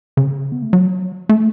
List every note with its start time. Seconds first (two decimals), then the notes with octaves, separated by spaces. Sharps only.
0.17 C#3
0.52 B3
0.62 A3
0.73 F#3
1.29 A3